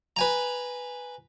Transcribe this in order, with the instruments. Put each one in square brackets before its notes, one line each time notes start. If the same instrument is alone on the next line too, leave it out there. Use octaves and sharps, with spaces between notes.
[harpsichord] B4 G#5 A#5